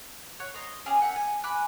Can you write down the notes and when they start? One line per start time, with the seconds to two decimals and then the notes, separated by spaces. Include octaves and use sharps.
0.40 C#5 F#5
0.54 C5 C#5 D#5 A#5
0.86 C#4 G4 G#4 F5
1.00 A#3 E5 F#5 G5
1.16 G#5
1.44 G#5 B5 D6 F#6